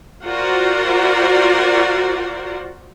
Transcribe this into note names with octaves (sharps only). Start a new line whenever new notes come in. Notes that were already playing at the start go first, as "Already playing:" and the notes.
F4 F#4 A#4 C5 D5 F#5